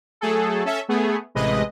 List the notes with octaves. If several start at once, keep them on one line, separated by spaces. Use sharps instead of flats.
F#3 A3 G#4 A4
C#4 A4 E5
A3 B3 G#4
A1 C3 G#3 B4 D#5